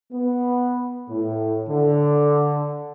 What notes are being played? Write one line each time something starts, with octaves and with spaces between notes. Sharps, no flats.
B3
A2
D3